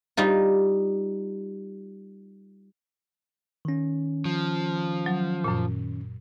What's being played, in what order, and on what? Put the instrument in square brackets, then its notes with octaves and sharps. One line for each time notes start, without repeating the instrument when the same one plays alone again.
[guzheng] G3 D#4 F4
[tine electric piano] D#3 C#4
[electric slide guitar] F3
[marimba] F#3
F#2 A#2